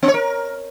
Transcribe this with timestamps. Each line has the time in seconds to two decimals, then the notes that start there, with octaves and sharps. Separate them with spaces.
0.03 B3
0.08 C#5
0.14 A#4